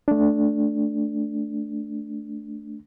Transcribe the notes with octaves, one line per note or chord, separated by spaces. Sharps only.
A3 D4